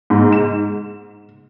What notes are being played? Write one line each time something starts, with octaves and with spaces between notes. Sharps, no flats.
G#2
E7